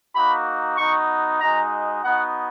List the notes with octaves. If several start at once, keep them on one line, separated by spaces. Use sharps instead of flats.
A#3 D#4 F#4 B5
B3 D#4 F#4 C#6
G#3 D#4 F#4 A#5
B3 D#4 F#4 F#5